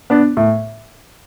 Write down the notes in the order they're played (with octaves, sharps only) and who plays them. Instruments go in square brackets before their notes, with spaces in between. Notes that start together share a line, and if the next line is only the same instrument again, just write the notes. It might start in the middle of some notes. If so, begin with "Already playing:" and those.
[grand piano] B3 D4
A2